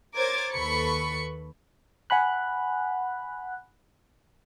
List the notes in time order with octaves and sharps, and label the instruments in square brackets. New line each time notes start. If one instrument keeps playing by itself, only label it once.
[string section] A#4 C5 C#5 D6 G#6 A6
D#2 A4 B4 B5 C#6 C#7
[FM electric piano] F#5 G#5 B5 F#6